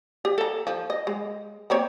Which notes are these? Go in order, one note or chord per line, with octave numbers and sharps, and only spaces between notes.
G4
A4 A#5
F3
D#5
G#3
A#3 C4 C#5